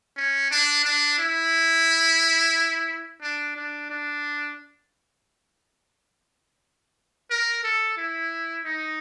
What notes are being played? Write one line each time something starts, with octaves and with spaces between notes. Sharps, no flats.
C#4
D4
D4
E4
D4
D4
D4
A#4
A4
E4
D#4